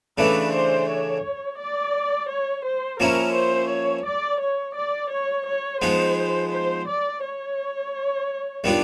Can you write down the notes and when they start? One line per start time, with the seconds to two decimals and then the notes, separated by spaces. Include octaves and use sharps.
0.18 C#3 E3 A3 D4 B4
0.53 C5
0.89 C#5
1.59 D5
2.29 C#5
2.64 C5
3.00 F3 A#3 C#4 E4 A#4
3.34 C5
3.70 C#5
4.05 D5
4.41 C#5
4.75 D5
5.11 C#5
5.47 C#5
5.81 F3 G#3 B3 D#4 C5
6.52 C5
6.87 D5
7.23 C#5
8.64 D#3 G3 B3 D4 F4